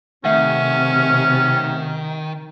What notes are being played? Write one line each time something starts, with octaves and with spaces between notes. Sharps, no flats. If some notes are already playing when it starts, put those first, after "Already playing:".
C3 D#3 A3 C#4 E5 F#5